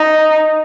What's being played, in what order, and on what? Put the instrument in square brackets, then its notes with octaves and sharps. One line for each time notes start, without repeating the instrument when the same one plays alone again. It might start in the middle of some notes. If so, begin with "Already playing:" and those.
Already playing: [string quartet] D#4